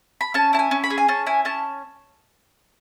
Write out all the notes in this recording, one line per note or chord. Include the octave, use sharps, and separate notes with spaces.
B5
C#4 A5
E4 A5
G#5
C#4
B5
G#4
G#5
C#4 A5
E4 G#5
C#4 A5